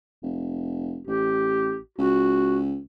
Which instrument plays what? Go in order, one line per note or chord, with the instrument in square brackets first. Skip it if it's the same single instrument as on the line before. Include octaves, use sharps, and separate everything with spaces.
[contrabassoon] F1
[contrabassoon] A1 [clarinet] G4
[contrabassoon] C#2 [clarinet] F#4